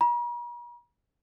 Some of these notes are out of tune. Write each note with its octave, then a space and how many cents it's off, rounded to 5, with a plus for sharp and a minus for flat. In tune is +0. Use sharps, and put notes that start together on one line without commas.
A#5 +45